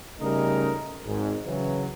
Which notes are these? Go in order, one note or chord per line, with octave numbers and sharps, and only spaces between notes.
C#3 G3 A3 C#4 D#4 A#4
G#1 G#2
C#3 E3 F#3